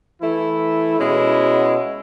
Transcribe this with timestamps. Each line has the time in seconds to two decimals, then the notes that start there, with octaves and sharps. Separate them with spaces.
0.21 E3 A3 E4
1.00 B2 G#3 C#4 E4